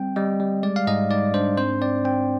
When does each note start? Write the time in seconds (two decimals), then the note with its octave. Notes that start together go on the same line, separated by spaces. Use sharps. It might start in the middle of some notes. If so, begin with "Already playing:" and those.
Already playing: G3 C4 G5
0.16 G3 D#5
0.40 G3
0.63 G#3 D5
0.76 F5
0.87 G#2 D#5
1.11 G#2 D5
1.34 D4 C5
1.57 C4 C5
1.81 C4 D5
2.05 C4 G5